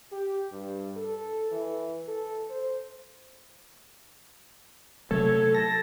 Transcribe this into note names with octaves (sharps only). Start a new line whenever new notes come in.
G4
G2
A4
E3
A4
C5
C3 F#3 A3 A4 C#5
A5 A#6